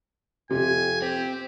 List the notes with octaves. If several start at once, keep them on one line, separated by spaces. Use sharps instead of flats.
F2 C3 G#5
C4 G4